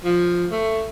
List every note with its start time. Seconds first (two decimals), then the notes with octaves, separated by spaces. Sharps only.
0.04 F3
0.51 A3